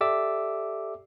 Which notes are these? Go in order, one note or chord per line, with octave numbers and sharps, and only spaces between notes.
G4 A4 D5 E5 D6 E6